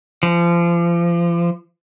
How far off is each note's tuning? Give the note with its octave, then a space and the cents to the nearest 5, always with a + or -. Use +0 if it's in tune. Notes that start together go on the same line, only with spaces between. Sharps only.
F3 -30